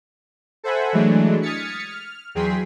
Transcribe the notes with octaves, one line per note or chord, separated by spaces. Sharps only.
A4 C5 E5 F#5 G#5 B5
E3 F#3 G#3 A3 D4
D#6 F6 G#6 A6 B6 C#7
F6
E2 F#3 G#4 G5 C6 B6